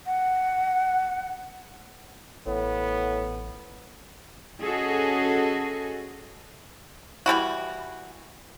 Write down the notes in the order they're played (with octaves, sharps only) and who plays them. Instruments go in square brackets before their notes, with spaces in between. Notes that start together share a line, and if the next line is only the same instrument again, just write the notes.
[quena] F#5
[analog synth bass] A1 [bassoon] A2 [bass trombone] B3
[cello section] C#4 F#4 G#4 A4 D#5
[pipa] E3 G3 E4 F#4